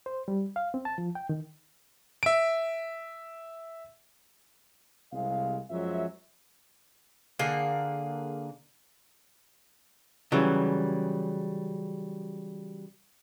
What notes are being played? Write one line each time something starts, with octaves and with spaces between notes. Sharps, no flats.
C5
G3
F5
C4
A5
F3
G5
D#3
E5 D7
C2 C3 G#3 F5
F#2 F3 F#3 G#3 E5
D3 A#3 G#4
C#3 E3 F#3 G3